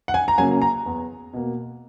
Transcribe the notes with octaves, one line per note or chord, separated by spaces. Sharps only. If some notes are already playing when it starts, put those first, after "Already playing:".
F#5
G#5
A#5
C#3 F#3 A#3 G#5
A#5
E2
B2 A#3